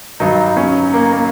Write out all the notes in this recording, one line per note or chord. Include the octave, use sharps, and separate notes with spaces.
G2 D#3 F#3 D#4
C#4
A#3
A#3